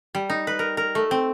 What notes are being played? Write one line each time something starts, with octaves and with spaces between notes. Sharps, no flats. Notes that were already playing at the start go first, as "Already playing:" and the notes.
G3
D#4
B4
A#4
A#4
A3
C4